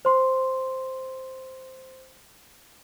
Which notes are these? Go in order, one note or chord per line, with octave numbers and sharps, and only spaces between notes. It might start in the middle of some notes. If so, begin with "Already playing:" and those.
C5 C6